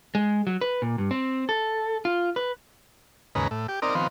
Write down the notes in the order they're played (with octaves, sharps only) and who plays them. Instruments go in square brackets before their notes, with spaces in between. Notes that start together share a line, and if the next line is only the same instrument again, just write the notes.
[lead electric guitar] G#3
F#3
B4
A#2
G2
C4
A4
F4
B4
[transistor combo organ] D#2 G#2 C#3 B4 A#5
A2
G4
C4 D#4 A#4 D5
D#3 F3 B3 C4